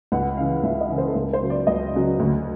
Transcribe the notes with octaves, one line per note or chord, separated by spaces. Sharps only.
C#2 F#5
C#3 E3 F5
C#2 E5
D#5
C#3 E3
C5
A4
C#2 A#4
C5
C#3 F#3
D5
C#2 D#5
C#3 F#3
D2